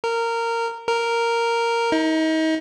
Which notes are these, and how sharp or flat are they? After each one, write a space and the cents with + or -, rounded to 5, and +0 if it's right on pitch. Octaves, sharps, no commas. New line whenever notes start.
A#4 -15
A#4 -5
D#4 +35